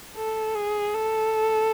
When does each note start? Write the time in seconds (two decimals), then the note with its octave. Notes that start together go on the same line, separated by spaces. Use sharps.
0.16 A4
0.55 G#4
0.95 A4